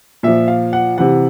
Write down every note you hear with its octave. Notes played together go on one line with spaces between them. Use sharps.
A#2 F3 E5
F5
F#5
C3 E3 F#5